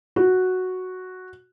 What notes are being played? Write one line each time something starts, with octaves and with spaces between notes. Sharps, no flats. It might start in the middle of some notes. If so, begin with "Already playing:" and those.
F#4